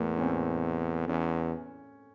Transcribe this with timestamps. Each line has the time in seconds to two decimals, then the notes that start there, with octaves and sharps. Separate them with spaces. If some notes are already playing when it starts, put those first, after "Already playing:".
Already playing: E2 A3 A#3
0.17 C#4
0.22 C4
1.08 E2 C#4